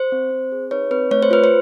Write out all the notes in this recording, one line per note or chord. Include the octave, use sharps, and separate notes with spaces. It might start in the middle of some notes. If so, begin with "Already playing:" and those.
Already playing: C5
C4
C4
G#4
D#4 B4 C#5
C4 B4
A3 C#5
C5
F4 B4
C5